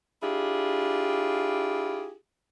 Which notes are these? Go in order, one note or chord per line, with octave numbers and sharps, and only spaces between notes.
D4 E4 F4 G4 G#4